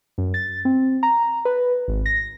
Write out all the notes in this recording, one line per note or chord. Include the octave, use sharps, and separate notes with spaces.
F#2
A6
C4
A#5
B4
G#1
A#6